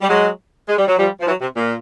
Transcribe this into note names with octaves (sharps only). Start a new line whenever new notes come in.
G3
F#3 G#3
G#3
G3
F#3
F3 G3
F3
E3 F#3
C3
A#2